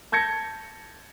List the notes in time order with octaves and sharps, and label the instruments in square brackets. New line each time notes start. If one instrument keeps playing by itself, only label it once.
[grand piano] A5 G6 G#6 A#6 C#7